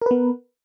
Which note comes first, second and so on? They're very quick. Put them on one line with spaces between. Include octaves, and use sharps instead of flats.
A#4 B4 B3